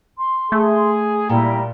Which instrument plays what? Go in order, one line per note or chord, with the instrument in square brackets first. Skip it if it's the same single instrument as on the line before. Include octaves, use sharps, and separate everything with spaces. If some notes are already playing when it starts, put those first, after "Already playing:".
[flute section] C6
[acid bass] A3 [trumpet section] G#4
[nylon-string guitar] A#2 [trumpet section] G3 A#5 [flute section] E4 G5